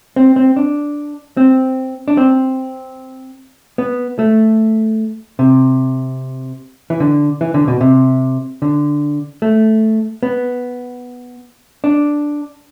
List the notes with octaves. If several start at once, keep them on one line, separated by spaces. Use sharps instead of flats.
C4
C4
D4
C4
D4
C4
B3
A3
C3
E3
D3
E3
D3
B2
C3
D3
A3
B3
D4